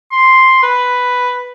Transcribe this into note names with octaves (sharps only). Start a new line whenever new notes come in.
C6
B4